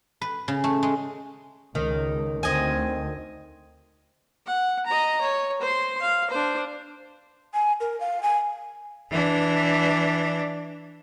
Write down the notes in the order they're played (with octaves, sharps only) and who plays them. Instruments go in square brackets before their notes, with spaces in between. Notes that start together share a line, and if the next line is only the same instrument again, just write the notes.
[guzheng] B4
C#3
A3
G#3
[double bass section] C#2 [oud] D#3
[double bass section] D2 [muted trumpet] C4 [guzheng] D#5 G#5
[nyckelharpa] F#5
D#5 A#5
C#5
C5 C6
F5
D4 C5
[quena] G#5
A#4
F5
G#5
[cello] E3 D4